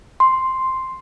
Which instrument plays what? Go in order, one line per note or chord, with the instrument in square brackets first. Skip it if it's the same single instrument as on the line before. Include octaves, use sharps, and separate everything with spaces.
[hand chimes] C6